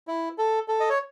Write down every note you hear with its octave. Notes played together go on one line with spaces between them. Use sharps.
E4
A4
A4
D#5
C#5